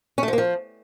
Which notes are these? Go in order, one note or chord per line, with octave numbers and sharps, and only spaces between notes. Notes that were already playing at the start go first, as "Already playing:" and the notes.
C#4
A3
F3
A#3
F3